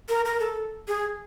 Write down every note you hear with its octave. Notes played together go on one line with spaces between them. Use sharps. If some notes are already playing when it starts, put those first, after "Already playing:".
A#4
A#4
A4
G#4